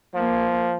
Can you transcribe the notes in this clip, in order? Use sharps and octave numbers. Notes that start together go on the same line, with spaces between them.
F3 A#3